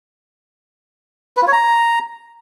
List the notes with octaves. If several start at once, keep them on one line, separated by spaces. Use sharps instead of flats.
B4
F4
C#5
A#5